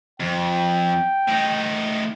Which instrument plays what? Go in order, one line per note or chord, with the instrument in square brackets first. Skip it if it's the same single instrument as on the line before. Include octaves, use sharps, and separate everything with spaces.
[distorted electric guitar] F2 [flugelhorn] G5
[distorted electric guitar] A2 D#4